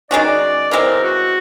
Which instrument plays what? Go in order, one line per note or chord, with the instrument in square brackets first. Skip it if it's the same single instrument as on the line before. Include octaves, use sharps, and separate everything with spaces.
[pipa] D#3 G#3 C#4 F#4 [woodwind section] D5
[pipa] C#3 E3 G#3 C4 [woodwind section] A#4
[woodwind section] F#4